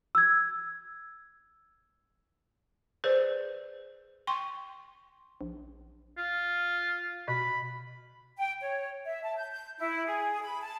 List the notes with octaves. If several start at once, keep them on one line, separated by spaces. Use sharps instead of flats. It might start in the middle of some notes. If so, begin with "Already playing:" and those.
E6 G#6
G#4 B4 C5 D5
G5 C6 C#6
A#1
F4
B2 B5
G5
C#5
E5
A5
G6
G6
E4
G#4
B5
A5